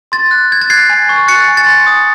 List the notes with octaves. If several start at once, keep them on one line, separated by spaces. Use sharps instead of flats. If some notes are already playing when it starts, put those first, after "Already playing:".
C6 A6
F#6
F#6 G#6
A6
F#6 G#6 C7
G#5
C#6
F#6 A6 C#7
G#5
A6 C#7
C6
D#6